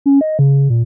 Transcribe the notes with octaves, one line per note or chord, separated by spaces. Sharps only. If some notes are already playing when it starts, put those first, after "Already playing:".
C#4
D#5
C#3
A#2